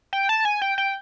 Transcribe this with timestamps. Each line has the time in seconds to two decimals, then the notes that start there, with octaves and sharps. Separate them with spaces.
0.13 G5
0.29 A5
0.45 G#5
0.62 G5
0.78 G5